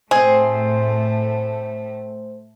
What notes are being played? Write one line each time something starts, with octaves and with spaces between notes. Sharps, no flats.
A2 A3 C4 G#4 C5